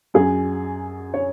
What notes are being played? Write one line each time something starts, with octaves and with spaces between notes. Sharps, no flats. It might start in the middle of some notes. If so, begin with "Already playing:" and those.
F#2 F#3 G#4
C#5